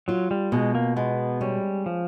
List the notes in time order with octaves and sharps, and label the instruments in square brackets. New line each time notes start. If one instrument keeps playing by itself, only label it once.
[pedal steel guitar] F#3 [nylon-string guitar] F4
[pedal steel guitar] G3
[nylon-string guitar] B2 [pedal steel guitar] G#3
[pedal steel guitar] A#3
[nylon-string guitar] G#3 [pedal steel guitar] B3
[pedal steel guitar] G3 [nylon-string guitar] C#4
[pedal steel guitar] F3